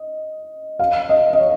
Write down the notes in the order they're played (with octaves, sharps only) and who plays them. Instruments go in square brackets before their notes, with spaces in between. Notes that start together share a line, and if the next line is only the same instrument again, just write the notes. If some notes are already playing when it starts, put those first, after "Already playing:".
Already playing: [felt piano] D#5
F5
D#5
D#5
C#5